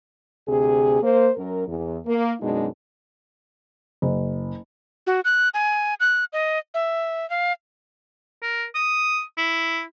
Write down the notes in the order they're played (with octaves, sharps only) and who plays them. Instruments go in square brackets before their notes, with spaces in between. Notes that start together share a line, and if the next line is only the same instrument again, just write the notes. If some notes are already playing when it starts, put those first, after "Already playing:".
[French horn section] D2 C3 G#4
A#3 C5
F#2 A#4
E2
A#3
F#2 B2 G#3 D4 D#4
[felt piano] F#1
[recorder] F#4
F#6
G#5
F#6
D#5
E5
F5
[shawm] A#4
D#6
E4